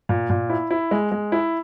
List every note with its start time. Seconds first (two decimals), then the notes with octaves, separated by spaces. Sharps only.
0.09 A#2
0.30 A#2
0.50 E4
0.71 E4
0.91 G#3
1.12 G#3
1.32 E4